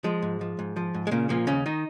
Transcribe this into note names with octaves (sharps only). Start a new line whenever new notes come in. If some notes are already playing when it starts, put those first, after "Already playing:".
F3 G#3
G#2
F3
G#2
F3
G#2
G#3
A#2 C#3 A#3
A#2 F3 A#3
D#2 C#3 C#4
D#3 D#4